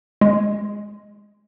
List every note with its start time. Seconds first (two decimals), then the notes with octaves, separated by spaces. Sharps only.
0.21 G#3